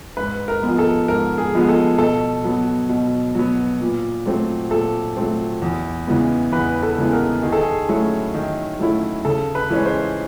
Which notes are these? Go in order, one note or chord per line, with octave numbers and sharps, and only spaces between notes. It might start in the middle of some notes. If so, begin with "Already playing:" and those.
G#2 B4
A#4
F3 G#3 B3
A4
G#2 A#4
G#4
F3 G#3 B3
A4
B2 A4
F#3 B3
B2
F#3 B3
A#2
F#3 A3 C4
A#2 A4
F#3 A3 C4
E2
C#3 E3 G#3 B3
E2 B4
A4
C#3 E3 G#3 B3
A#4
D#3 G#4
A4
G#4
F#3 A3 C#4 E4
D#3
F#3 A3 C#4 E4
C#3 A4
B4
E3 G#3 C#4
C5